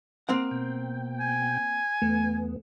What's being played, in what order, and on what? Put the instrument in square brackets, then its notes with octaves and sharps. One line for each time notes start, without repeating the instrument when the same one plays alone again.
[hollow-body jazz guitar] A#3 C4 F#5
[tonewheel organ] B2 G5
[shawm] G#5
[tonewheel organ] E2 B3 [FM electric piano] A3